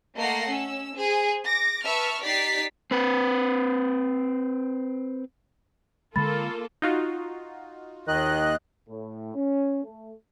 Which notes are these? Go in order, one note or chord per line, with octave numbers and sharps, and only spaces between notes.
A3 A#3 D#5 F#5 A#6 C7
C#4 E6
G#4 C5
D6 A#6
B4 E5 A5 C#6 F6
D#4 G4 D5 A6 B6 C7
C4 B4
D3 G#3 A#3 F4 A4 B5 A6
D#4 F4 F#4
D#2 D#3 D#5 F#6
A2
C#4
A3